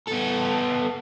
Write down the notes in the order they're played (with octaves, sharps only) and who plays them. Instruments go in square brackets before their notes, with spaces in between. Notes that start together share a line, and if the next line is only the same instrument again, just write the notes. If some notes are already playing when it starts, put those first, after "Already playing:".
[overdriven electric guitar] B3 A4